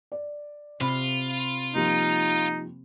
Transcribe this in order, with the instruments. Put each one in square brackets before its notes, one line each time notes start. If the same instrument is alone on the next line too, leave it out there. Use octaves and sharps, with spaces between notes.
[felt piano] D5
[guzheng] C3 [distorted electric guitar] F4 [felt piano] B5
[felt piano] F3 G3 A#3 [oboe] D#4